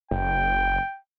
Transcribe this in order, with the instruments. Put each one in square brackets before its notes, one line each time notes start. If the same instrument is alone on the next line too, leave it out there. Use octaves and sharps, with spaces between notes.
[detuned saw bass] F#1 [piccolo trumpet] G5